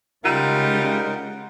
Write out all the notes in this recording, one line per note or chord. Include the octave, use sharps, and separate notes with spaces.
C#3 G3 G#3 D#4 F4 A#4 F#5